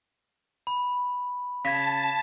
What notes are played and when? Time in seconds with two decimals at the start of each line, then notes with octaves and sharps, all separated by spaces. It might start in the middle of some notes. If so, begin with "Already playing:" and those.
0.67 B5
1.65 C#3 A5 G#6 A#6 B6